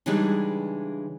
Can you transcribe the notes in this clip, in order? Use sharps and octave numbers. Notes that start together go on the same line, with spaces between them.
C#3 E3 G3 G#3 D4 D#4